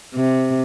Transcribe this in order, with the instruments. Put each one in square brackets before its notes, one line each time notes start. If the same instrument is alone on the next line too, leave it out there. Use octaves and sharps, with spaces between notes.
[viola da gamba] C3